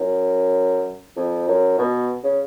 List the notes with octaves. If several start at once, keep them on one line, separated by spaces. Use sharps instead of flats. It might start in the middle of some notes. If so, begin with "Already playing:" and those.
Already playing: F#2
F2
F#2
B2
C#3